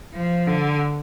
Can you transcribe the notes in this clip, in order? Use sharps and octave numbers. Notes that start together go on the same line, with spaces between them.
F3
D3